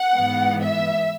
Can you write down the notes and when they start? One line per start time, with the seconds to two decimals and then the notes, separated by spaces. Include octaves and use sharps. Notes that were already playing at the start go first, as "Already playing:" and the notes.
Already playing: F#5
0.14 G#2 E3 B3
0.62 E5